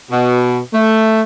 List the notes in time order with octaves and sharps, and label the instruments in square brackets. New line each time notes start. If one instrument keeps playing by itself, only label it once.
[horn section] B2
A3